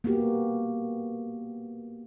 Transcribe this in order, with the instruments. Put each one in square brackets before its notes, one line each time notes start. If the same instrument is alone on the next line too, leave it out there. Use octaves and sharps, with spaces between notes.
[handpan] A#3 B3 F#4 G4